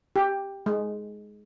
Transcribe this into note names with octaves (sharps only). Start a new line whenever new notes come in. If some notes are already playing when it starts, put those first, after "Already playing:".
G4
G#3